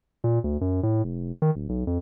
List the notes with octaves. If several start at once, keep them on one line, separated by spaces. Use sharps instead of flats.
A#2
D2
F#2
A2
F1
D#3
D1
B1
F2